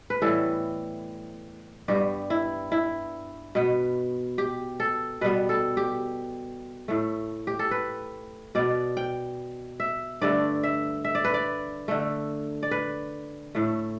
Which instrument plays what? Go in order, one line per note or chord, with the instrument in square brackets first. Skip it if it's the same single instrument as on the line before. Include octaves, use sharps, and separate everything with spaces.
[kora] B4
A2 E3 G3 B3 A4
G2 G3 B3 G4
E4
E4
B2 B3
G4
A4
B2 G3 B3 B4
A4
G4
A2 A3
G4
A4
B4
B2 B3 D5
G5
E5
G2 D3 A3 D5
E5
E5
D5
B4
D5
D3 A3
D5
B4
A2 A3